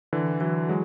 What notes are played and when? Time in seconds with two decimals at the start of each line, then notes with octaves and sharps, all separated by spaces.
0.13 D3 E3
0.41 E3 F#3
0.69 F#3 G#3